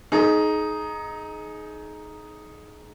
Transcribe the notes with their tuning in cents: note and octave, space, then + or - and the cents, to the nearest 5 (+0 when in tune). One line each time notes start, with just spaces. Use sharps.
D#4 +0 G#4 +30